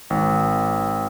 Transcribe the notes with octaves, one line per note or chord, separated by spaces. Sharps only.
G#1